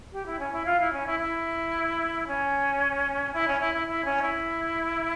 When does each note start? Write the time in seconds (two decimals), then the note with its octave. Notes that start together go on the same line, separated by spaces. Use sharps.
0.12 G4
0.26 E4
0.39 C#4
0.52 E4
0.65 F4
0.80 E4
0.92 C#4
1.06 E4
1.19 E4
2.26 C#4
3.33 E4
3.47 C#4
3.60 E4
3.74 E4
3.87 E4
4.04 C#4
4.22 E4